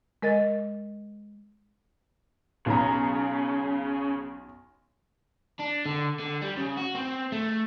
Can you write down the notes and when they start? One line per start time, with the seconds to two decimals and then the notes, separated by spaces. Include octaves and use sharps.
0.22 G#3 A#4 D#5 A6
2.66 B1 C#3 A#5
5.60 D4
5.86 D3
6.19 D3
6.42 G3
6.57 C#3
6.77 F#4
6.95 C4
7.32 A3